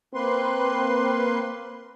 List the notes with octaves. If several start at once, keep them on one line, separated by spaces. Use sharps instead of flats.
A#3 C4 B4 C6